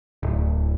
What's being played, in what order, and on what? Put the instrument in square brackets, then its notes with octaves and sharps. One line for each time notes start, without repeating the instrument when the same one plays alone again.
[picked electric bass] D1